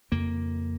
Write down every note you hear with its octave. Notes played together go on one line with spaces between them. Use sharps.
F2 C#3 A#3